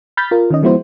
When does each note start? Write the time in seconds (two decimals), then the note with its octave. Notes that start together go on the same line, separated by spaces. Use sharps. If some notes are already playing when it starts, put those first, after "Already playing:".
0.17 B5 F6 G6 A6 B6
0.31 F4 A#4
0.50 D#3 C#4 D#5
0.62 F3 G#3 B3 E4 F#4 C5